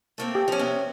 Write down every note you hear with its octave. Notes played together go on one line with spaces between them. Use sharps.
A3 A#3 C4
G4
F3 C#4
C3 B3 C#4